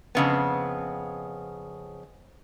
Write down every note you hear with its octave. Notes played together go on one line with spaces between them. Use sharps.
F2 C#3 B3